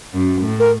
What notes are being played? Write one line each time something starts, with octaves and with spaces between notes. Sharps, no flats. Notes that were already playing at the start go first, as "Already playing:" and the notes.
F#2
A2
A#4